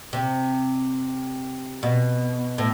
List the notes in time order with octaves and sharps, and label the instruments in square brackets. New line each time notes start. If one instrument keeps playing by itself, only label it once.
[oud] C3
B2
A2